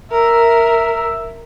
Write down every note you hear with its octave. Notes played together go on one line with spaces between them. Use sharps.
A#4 E5